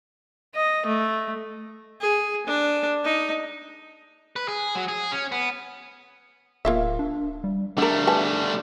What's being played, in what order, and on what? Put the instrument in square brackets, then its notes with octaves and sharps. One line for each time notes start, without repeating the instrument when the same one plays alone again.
[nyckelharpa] D#5
A3
G#4
D4
D#4
[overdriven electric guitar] B4
G#4
F#3
G#4
C#4
B3
[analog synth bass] D1 [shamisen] A#3 F4 E5
[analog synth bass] D4
G3
[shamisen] D3 A#4 [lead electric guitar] G3 A3 [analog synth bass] D4
[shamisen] B4 G#5 A5